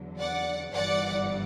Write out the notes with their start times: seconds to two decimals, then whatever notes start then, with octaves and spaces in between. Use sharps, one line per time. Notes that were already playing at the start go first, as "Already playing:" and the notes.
Already playing: E2 D3 F#3
0.19 D5 F#5
0.74 G1 G2 E3 G3 D5 F#5